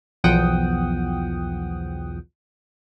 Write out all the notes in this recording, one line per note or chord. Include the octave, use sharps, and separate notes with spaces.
B1 E2 F3 F#5 G5 D#6